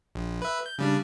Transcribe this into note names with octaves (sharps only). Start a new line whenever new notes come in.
A#1
B4 E5
G6
C#3 G3 D4